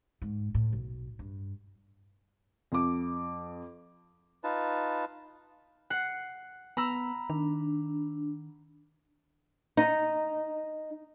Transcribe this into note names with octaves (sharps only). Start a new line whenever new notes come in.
G#2
A2
B1
G2
F2 D6
D#4 F4 B4 A5
F#5 C7
B3 A#5 B5 E6
D#3 D4
D#4